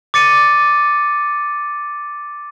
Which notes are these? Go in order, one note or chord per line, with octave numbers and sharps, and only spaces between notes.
D6 A6 C#7 D#7